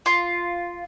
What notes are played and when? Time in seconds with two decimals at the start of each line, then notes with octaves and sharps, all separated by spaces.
0.06 F4